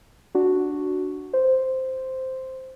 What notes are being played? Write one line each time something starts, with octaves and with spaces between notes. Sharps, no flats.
D4 F#4
C5